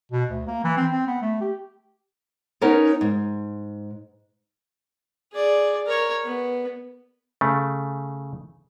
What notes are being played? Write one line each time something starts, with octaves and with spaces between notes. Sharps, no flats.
B2
D2
A#3
E3
C4
C4
B3
A3
G4
B3 C#4 D#4 A#4 C#5
G#2
G#4 D5
A#4 C#5
B3
C#3 A3